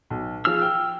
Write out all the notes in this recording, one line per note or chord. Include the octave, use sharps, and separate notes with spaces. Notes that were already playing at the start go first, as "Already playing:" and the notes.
B1
F3 G#4 E6 F6
G5